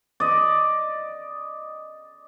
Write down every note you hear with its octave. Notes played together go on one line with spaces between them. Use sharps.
D5 D#5